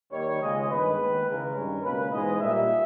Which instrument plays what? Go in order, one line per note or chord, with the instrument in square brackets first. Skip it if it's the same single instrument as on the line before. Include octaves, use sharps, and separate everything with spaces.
[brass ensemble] D#2 D#3 G3 C#5
C#2 C#3 G#3 D#5
G2 D#3 G#3 B3 B4
D#2 D#3 G#3
C#2 C#3 E3 G#3 A#4
G2 D#3 G3 C#4
C#2 B2 A#3 C#4 B4
G#2 E3 G#3 D#5
A#2 G3 A#3 E5